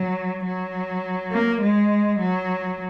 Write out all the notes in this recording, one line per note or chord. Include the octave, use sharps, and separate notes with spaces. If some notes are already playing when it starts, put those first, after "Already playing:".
Already playing: F#3
F#3
A#3
G#3
F#3